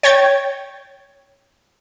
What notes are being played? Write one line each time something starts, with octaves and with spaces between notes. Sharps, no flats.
C#5 G5 G#6 A6